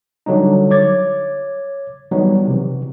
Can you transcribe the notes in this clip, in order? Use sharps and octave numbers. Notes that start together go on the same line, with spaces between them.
D3 F#3 G3 D#4
C#5 D6 G#6 A6
E3 F#3 G3 B3 D#4
C3 E3